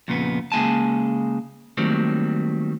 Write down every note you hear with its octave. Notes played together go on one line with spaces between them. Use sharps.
F2 A#2 C#3 B3
C#3 G#3 A#3 G#5 A5
D#3 F#3 G3 A3 A#3 C4